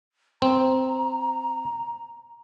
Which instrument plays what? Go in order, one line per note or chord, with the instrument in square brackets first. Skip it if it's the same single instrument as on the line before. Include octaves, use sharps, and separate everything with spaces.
[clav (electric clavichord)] C4 [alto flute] A#5